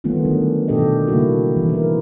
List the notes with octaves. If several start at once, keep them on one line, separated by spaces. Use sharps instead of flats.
D#3 G3 A3 B3 C#4 F4
D3 F#3 C#4 D4
B2 D#3 D4 G4 A4 D#5
C#3 G3 A#3 D#4 E4 F#4
E3 F3
E4 A#4